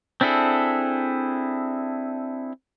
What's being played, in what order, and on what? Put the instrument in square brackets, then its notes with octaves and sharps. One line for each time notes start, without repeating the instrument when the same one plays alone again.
[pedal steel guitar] C4 D4 E4 G#4 A4